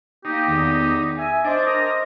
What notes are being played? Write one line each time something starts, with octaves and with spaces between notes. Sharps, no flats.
A#3 D#4 G4 G5
E2 D#3
E5 G#5
D4 C5 D#5 D6
A#4 D#6